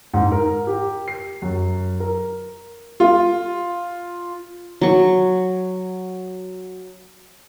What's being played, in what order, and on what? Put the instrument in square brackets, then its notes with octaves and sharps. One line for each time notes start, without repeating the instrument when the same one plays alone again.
[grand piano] G#2
A#4
G4
C7
F#2
A#4
F4
[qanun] F#3 C#6